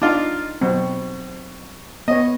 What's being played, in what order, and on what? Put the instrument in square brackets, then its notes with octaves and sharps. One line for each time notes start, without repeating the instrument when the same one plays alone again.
[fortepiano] D4 F4 [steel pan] D#4
[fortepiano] B2 [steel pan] F#3 C4
[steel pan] B3 C#5 [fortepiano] D#5